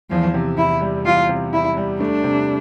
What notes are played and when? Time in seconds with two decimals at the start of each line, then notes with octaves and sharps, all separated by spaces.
0.10 E2 F3
0.34 C3
0.57 E2 E4
0.81 G3
1.05 E2 F4
1.29 C3
1.53 E2 E4
1.77 G3
2.01 A3 D4
2.24 C3